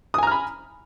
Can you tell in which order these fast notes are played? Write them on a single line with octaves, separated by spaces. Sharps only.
D#6 G#5 A#5 F6 B5